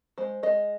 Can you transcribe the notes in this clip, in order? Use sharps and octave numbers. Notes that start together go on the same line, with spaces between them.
G#3 C5
G#3 D#5